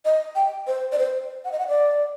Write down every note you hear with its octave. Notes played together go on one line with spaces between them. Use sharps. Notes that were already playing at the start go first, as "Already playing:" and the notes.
D#5
G5
C5
D5
C5
F#5
D#5
F#5
D5